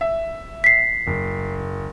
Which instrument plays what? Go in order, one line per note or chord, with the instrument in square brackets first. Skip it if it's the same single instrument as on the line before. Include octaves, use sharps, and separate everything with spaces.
[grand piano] E5
[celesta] B6 C7
[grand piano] F#1